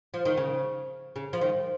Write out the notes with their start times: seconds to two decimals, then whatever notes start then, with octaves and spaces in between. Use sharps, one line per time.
0.14 F3
0.25 D#3
0.37 C#3
1.16 C#3
1.33 F3
1.41 D#3